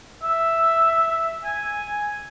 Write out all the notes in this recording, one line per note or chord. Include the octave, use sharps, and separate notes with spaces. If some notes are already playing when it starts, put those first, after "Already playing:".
E5
G#5